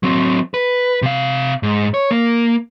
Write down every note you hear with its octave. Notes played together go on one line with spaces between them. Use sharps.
F#3 C4
B4
C3 F5
G#2
C#5
A#3